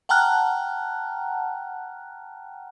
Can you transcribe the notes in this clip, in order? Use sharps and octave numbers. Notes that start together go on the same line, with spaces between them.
F#5 G5 A5 A#5 F6 F#6